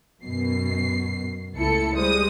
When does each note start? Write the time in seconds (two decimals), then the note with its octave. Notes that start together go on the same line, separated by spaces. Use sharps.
0.22 F#2 B2 C7
1.54 C#2 A3 E4 A4 C#7
1.95 G3 G#3 C5 D#6